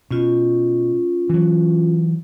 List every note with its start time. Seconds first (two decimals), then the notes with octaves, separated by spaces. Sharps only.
0.11 B2 C#4 F4
1.29 E3 F#3